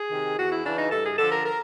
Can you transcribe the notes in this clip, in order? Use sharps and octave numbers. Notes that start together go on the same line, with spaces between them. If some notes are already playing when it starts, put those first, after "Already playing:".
Already playing: G#4
C3 D#3
E2 F#4
E4
C#3 E3 D4
D#4
G2 A4
G#4
D3 F3 A4
A#4
A#4